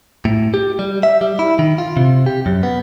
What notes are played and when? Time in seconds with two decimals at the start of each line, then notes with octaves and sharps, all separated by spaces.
0.25 A2
0.54 G4
0.79 G3
1.03 E5
1.21 G3
1.39 E4
1.59 D#3
1.78 F4
1.97 C3
2.26 G4
2.46 F#2
2.63 B3